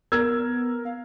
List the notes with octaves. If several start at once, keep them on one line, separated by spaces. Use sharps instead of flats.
B3 A#4 E6 G#6
F5